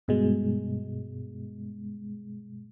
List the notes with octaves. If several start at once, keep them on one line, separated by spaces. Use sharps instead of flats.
G2 B2 G#3